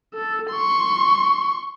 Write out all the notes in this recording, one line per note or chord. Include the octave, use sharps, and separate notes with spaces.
A4
C6 C#6